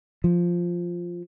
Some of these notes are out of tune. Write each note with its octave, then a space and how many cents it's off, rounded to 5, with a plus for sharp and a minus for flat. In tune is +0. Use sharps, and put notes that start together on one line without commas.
F3 +0